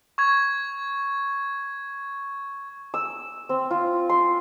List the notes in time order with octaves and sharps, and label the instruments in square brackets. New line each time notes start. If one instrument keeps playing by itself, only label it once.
[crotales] C#6 G#6
[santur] E6
C4
F4
C6